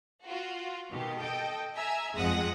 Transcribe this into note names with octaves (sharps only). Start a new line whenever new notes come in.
F4 F#4
B2 D#3 G4
A4 D#5 G5
E5 G#5 A#5 E6
G1 F2 G#3 F#5 D#6 A#6